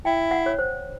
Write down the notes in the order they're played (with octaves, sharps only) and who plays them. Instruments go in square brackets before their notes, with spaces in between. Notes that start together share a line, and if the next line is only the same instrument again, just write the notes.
[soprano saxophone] E4 [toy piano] G5
[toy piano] F#5
C#5
C5